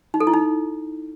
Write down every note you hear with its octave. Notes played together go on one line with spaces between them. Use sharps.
D#4
A4
E4
D#4